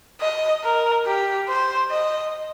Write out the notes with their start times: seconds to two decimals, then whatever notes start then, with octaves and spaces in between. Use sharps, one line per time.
0.21 D#5
0.64 A#4
1.06 G4
1.48 C5
1.91 D#5